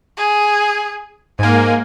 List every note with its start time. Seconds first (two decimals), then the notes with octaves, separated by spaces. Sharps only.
0.17 G#4
1.39 G#2 A#3 G#5